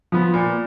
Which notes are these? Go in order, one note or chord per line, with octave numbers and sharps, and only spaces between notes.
F3 B3
A#2